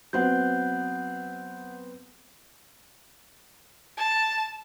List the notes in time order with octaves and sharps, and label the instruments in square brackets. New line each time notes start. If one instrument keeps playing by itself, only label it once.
[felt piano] F#3 B3 C4 [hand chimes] F#5 G6
[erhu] A5